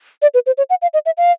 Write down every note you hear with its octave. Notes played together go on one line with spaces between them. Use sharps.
D5
B4
C5
C#5
F#5
F5
D#5
E5
F5